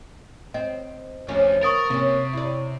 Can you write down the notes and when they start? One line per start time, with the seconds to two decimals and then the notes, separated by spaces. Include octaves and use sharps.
0.54 C4 D#5
1.29 D2 F3 C#4
1.63 B3 A#4 C#6 D#6 A6
1.90 C3 A#3 C#4
2.33 E4 D5